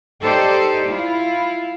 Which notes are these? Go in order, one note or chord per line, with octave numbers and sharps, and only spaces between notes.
D#4 G4 A4 C5 D5
E4 F4